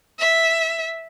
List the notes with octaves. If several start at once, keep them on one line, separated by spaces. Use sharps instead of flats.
E5